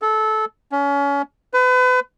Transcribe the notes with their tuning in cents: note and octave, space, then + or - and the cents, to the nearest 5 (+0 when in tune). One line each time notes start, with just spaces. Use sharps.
A4 -20
C#4 +30
B4 +35